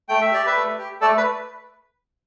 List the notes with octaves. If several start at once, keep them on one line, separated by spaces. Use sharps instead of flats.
A3 G5
E5
G4 D5
B4 E5
A3
G4
A3 A4 D5
B4